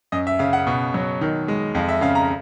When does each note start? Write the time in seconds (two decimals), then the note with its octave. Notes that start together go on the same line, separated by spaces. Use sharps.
0.12 F#2 D#5
0.27 E5
0.39 C#3 F5
0.53 F#5
0.67 B2
0.94 F#3
1.21 D#3
1.48 G#3
1.75 F2 F5
1.89 E5
2.01 C#3 F5
2.15 A#5